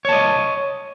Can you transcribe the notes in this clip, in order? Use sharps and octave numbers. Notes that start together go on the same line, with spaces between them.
C#5 D#5 A5